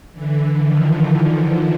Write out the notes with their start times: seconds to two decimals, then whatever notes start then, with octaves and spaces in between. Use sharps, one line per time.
0.13 D3 E3
0.64 D#3 F3